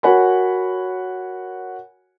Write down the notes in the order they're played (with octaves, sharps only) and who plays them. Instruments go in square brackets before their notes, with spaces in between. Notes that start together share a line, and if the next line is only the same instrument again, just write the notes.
[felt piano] F#4 A#4 C#5 F#5 G#5 B5